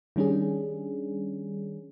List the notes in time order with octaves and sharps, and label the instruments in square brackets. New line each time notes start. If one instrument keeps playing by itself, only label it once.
[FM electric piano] D#3 G3 C#4 D4 G#4